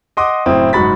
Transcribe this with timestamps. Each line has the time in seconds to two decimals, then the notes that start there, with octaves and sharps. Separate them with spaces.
0.17 D#5 F#5 C6 D6 D#6
0.46 F#1 A2 C4 E4 D#6
0.73 F#1 G#2 F#4 B5 A6 B6